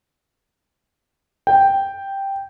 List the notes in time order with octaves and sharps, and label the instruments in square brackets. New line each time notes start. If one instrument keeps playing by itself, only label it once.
[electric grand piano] G5